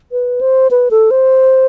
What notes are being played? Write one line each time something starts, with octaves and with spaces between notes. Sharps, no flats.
B4
C5
B4
A4
C5